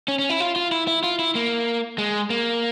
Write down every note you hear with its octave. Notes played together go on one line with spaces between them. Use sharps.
C#4
C#4
E4
F4
F4
E4
E4
F4
E4
A#3
G#3
A#3